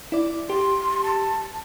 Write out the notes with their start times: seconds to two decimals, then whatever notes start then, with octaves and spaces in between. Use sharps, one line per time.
0.12 E4 D5
0.50 G4 C6
1.03 A5